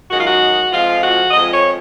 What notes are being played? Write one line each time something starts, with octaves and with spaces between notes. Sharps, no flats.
F#2 D#3 G#3 F#4
F4
F#4
F2 F3 G#3 F4
F#4
F2 F3 G#3 D#5
C#5